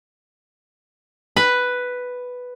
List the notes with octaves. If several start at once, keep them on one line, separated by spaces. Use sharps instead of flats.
B4